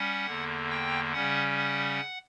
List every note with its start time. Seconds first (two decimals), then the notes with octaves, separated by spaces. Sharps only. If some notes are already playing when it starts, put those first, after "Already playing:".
Already playing: G3 C#4 F#5
0.26 E2 D3 A#3
0.70 G5
1.13 C#3 G3 C#4 F#5
1.57 F#5